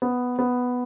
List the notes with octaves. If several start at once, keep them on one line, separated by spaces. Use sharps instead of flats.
B3
B3